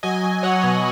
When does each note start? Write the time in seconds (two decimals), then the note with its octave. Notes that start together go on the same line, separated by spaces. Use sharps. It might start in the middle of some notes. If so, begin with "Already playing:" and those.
0.03 F#3 D#5 G#5
0.23 F#3
0.43 F#3 C#5 F#5
0.64 B2